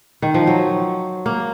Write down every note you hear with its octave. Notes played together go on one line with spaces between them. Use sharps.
D#3
F3
F#3
A#3